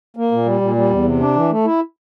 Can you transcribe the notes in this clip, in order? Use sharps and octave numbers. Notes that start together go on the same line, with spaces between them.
A#3
A#2
G3
A#2
G3
E2
C3
D4
E3
A3
E4